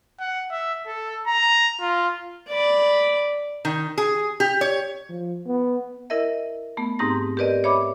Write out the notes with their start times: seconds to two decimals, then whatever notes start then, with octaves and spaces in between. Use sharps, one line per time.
0.20 F#5
0.51 E5
0.87 A4
1.27 A#5
1.81 F4
2.49 D5 B5
3.65 D#3
3.98 G#4
4.40 G4
4.61 C#5
5.09 F3
5.47 B3
6.10 E4 A#4 D#5 E5
6.77 A3 B3
6.99 G#2 C4 D#4 G4 A#5 A#6
7.37 G4 A#4 B4 D5 D#5
7.64 C#5 E5 B5 D6